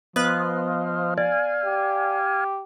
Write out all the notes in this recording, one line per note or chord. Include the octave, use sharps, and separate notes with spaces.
F3 B3 B4 C5 D#5 F5 F#6
D5 F5 G#5
G4